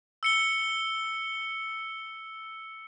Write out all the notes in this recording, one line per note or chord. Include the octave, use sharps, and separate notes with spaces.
E6 C#7 G7